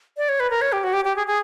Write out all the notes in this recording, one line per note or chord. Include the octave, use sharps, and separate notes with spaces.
D5
C#5
B4
A#4
C#5
G4
F#4
G4
G4
G#4
G#4